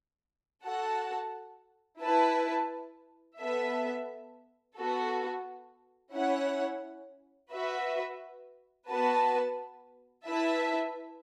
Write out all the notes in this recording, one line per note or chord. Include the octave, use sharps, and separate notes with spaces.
F#4 A4 F#5 A5
E4 B4 A5
B3 A4 E5
B3 F#4 A4
C#4 E4 C#5 F#5
F#4 B4 E5
B3 F#4 B4 A5
E4 B4 E5 A5